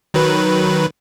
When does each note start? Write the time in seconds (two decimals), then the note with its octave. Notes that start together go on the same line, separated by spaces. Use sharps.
0.14 D#3 F#3 B4